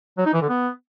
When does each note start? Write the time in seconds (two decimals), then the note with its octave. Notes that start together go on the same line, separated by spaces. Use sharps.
0.18 F#3
0.26 D#4
0.34 E3
0.42 D3
0.50 B3